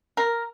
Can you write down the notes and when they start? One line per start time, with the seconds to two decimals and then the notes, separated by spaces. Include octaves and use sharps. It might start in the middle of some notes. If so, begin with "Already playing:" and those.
0.17 A#4